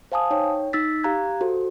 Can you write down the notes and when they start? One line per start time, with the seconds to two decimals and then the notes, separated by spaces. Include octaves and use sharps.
0.12 C5 F5 G#5 A5 D#6
0.31 D#4 C#5 G5
0.73 D#4 E6 A6 B6
1.03 G4 F5 A#5 F#6 G#6
1.41 F#4 A4 C5